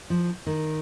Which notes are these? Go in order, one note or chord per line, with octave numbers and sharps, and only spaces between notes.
F3
D#3